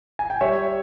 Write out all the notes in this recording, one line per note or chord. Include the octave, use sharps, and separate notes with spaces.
G#5
G5
G3 C#5 E5